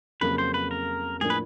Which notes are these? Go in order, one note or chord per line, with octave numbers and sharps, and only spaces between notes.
F2 C#3 F#3 A#3 B4
C5
B4
A#4
A2 F3 A#3 D4 G#4
B4